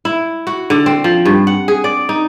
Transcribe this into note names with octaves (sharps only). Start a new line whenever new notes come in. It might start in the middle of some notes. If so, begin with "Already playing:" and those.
E4
F#4
D3
C4
F3
G2
F#5
G#4
D5
D#4